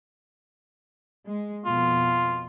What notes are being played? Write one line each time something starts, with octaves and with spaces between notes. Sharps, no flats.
G#3
F2 B2 F4